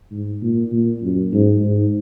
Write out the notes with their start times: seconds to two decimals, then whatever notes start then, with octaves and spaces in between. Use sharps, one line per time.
0.11 G#2
0.42 A#2
0.72 A#2
1.02 F#2
1.33 G#2
1.63 G#2